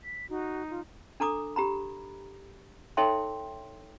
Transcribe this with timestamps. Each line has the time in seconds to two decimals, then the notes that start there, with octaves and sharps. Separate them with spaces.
0.04 B6
0.29 D#4 F#4
0.70 F4
1.20 D4 A4 A#5 D6 D#6
1.56 G4 A#5 B5
2.97 D#4 A4 C#5 E5 G5 C6